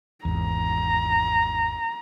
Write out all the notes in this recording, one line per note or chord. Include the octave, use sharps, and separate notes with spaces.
G#1 E2 A#5